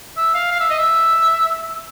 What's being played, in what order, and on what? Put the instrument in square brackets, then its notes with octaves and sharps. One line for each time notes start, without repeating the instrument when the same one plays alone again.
[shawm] E5
F5
F5
E5
D#5
E5